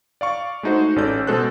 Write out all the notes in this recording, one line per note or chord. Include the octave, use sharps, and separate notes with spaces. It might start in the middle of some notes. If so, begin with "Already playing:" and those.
D5 F5 C#6
G#3 A3 D#4 F#4 C5
A1 C#4 A4 D5 G6
B2 G#3 A4 C5 F#6